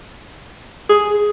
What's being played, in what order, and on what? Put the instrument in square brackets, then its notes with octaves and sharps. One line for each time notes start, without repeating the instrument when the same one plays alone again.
[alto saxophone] G#4